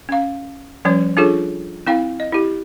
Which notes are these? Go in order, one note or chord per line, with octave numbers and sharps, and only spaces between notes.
C#4 F5
F3 G3 C#4 C#5
D4 F4 G#4 A4 C#5
C4 E4 F5 G5
D#5
E4 G4